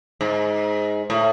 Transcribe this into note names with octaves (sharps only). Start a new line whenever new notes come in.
G#2
A2